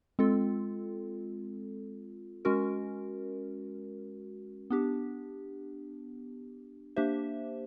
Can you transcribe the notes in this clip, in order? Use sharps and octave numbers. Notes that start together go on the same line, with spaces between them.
G#3 C4 F4 A4
G#3 C#4 F#4 A#4
B3 D4 G4
A#3 D4 G4 C5 E5